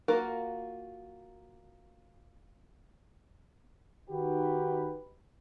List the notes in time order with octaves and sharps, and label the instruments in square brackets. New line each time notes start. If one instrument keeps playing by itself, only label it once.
[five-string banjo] A#3 F4 F#4 A#4
[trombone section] D#3 D#4 F#4 G4 B4